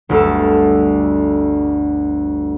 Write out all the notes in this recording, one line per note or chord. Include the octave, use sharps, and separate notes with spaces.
G1 D2 A3 A4